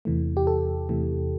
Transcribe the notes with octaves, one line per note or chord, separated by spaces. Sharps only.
E2 C3 E3 A3
G4
A4
E2 C3 E3 A3